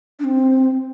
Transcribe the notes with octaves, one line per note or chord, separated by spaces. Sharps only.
D4
C4